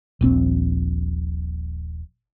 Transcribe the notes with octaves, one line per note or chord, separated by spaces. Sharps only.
D#1 A#1 C4